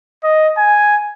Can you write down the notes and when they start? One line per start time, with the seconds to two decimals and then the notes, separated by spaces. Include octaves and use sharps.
0.23 D#5
0.58 G#5